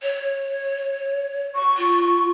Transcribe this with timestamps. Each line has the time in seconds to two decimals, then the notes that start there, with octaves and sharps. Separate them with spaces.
0.02 C#5
1.55 C#6
1.77 F4